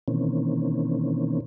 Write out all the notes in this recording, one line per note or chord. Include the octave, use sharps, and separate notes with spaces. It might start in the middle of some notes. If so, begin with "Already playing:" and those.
B2 D#3 E3 A#3 C4 C#4